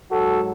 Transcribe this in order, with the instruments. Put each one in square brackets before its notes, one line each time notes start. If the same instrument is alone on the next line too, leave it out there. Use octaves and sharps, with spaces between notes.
[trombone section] G#2 F#3 F#4 A4